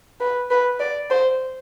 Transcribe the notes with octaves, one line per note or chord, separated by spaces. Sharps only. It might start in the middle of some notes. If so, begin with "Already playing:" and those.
B4
B4
D5
C5